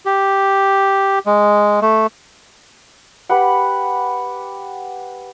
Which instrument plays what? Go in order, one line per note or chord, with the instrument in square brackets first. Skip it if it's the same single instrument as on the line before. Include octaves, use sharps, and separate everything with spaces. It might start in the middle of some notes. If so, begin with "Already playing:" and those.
[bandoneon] G4
G#3
A3
[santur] G4 B4 F#5